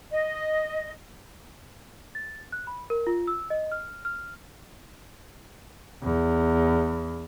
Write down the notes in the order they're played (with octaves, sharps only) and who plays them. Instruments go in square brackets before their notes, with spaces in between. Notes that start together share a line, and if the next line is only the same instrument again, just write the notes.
[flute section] D#5
[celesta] A6
F#6
B5
A#4
F4
E6
D#5
F6
F6
[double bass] E2